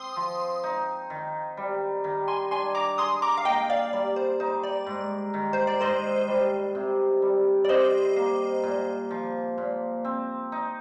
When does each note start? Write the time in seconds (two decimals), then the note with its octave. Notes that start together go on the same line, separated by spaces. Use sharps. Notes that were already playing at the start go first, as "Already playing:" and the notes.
Already playing: C4 C6 D#6
0.16 F3
0.64 D#4
1.10 D#3
1.57 G3
2.04 D#3
2.28 G#5 C6
2.51 D4 G#5 C6
2.75 A#5 D6
2.98 G#4 C6 D#6
3.22 A#5 D6
3.38 F5
3.45 A#3 D#5 G5
3.70 D5 F5
3.93 G3 D5
4.16 C5
4.40 D#4 C5
4.64 D5
4.86 G#2
5.34 D#3
5.53 C5
5.67 D5
5.81 G#2 C5 D#5
6.28 G3
6.75 C3
7.22 G3
7.65 D5
7.69 C3 C5 D#5
8.16 A#3
8.63 A#2
9.11 F3
9.58 A#2
10.05 C4
10.52 D#4